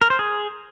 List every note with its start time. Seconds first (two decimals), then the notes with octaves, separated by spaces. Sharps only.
0.01 A#4
0.10 C5
0.19 G#4